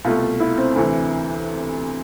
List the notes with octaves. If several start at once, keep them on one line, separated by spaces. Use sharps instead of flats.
C2 B2 A3 F4
E4
C4
D2 C3 E3